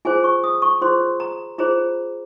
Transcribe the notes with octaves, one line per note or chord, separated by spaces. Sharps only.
F4 G#4 C5 G#5
C#6
D#6
C#6
F4 G#4 C5 C6
A#5
F4 G#4 C5 A#5